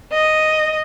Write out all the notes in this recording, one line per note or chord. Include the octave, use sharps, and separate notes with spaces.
D#5